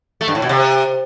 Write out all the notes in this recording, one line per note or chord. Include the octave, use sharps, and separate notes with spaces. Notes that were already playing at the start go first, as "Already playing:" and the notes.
A3
G2
A2
B2
C3